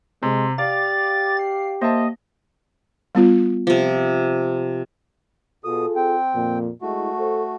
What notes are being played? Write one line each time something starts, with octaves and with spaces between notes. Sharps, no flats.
C3 G#3 C6
G4 D5 F5 D6 A6
C7
A#3 C5 D#5 E5 A5
G3 B3 F4
C3 F3
B2 F4 G#4 A4 D#6
C4 G5
F2 A#2
G#3 A3 E4 F#4
A4 C5